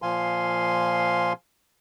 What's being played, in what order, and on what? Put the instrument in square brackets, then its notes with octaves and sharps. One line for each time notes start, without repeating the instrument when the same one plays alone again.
[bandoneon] A#2 F3 F5 G#5 C6